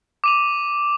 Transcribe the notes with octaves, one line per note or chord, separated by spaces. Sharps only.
D6 D#7 F7